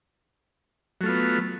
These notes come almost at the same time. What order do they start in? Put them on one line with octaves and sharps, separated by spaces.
F#3 A3 F4 B3